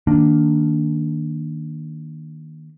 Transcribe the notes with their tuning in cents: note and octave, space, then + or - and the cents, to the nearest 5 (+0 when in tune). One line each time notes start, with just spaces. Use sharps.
D#3 +0 A#3 +0 D4 +0